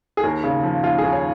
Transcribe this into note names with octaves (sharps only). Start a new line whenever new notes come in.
G#4
D#2 A#4
C#3
F3
D#2 F4
G#4
D#2
C#5